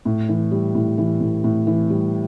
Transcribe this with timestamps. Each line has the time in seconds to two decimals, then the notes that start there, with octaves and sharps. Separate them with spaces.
0.05 A2
0.29 E3
0.51 G3
0.75 A2
0.98 E3
1.21 A2
1.44 A2
1.67 E3
1.90 G3